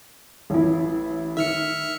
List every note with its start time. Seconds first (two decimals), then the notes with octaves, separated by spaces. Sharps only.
0.50 A1 E4
1.37 D#3 E5 F6 C#7